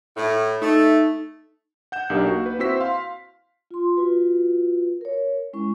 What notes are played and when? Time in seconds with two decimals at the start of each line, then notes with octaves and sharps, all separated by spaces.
0.17 A2
0.62 A3 D#4
1.92 F#5 G6 E7
2.10 B1 D4 G4 A#4
2.25 A#3 F#4
2.46 B4
2.59 C4 E4 F#4 C5 E6 B6
2.80 F5 C6
3.71 F4 C6
3.97 F4 F#4 B4
5.01 A#4 C#5
5.53 G#3 C#4 E4 C#6